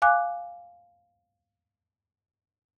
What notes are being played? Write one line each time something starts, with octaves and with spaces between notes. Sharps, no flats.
F5 G#5 D6 F#6